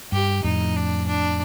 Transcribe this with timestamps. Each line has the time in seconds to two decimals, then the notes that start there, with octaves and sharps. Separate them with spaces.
0.12 G2 G4
0.44 F2 A2 D#4
0.76 D4
1.08 D4